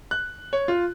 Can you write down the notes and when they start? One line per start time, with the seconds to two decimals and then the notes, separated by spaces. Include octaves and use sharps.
0.11 F#6
0.53 C#5
0.68 F4